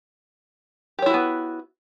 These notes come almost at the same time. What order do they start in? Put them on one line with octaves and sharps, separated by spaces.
G4 C#5 E4 F#4 B3